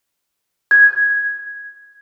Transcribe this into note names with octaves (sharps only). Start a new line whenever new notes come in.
G#6